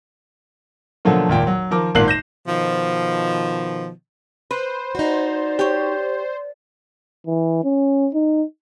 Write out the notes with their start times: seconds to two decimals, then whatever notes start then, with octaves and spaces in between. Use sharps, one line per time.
1.05 B2 D3 F3 F#3 A3 A#3
1.29 G#1 D#2 A#2 G5
1.47 F#3
1.71 D#3 F3 A#4 D6
1.95 G#1 A#2 A#3 F#6 C7 F#7
2.08 G6 A#6 E7
2.48 B2 D#3 F3
4.51 B4 C5
4.95 D#4 F#4 D5
5.59 G4 C#5
7.27 E3
7.64 C#4
8.14 D#4